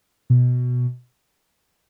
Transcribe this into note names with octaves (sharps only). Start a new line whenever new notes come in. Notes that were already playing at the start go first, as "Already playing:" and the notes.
B2